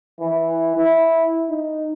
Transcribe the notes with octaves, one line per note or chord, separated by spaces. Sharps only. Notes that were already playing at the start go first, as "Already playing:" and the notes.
E3
E4
D#4